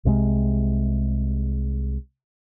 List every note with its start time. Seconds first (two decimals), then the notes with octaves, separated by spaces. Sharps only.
0.05 C2 C3 F#3 G#3